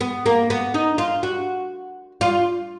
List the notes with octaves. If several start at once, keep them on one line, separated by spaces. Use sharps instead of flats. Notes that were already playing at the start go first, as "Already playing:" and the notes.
B3
A#3
B3
D#4
F4
F#4
F4